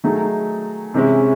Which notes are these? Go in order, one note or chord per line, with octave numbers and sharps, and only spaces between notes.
D#3 F#3 A3 D#4 G#4
C3 E3 G#3 C#4 E4